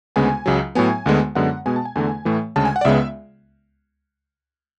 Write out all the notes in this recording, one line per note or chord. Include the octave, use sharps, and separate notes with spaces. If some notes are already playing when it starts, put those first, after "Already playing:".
D2 C#3 G#3 B3 G#5
C#2 C#3 F#3
A2 F#3 B3 G#5
D2 D3 G#3 B3
F#2 D3 G#3 B3 F#5
B2 G#3 B3 G#5
A5
G#5
E2 D3 A3 G#5
A2 E3 A3
D2 C#3 G#3 A5
G#5
F#5
D5
C#2 C#3 G#3 B3 E5